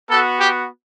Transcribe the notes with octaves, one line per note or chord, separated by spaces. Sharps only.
B3 F#4 A4
G4